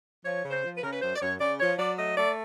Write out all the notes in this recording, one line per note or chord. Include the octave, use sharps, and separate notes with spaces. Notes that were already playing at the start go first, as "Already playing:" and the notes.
F3 C#5
C#3
C5
F3
B4
C#3 A#4
B4
F#2 C5
D5
F#2 C#5
C#3 D5
F3 C#5
F#3 D5
A3 D#5
A3 D5